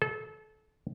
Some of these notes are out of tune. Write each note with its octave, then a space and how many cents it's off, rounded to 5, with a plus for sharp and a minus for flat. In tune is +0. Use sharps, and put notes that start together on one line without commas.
A4 -30